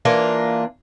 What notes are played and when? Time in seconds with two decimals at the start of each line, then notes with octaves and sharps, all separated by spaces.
0.05 E3 A#3 D4 F4